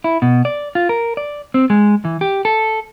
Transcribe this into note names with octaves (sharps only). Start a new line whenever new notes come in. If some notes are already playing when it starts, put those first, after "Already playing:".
E4
B2
D5
F4
A#4
D5
C4
G#3
E3
G4
A4